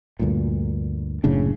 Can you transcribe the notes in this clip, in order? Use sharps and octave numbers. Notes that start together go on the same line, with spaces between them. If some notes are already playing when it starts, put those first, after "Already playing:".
D2 G2 A#2
F#1 A2 C#3 D4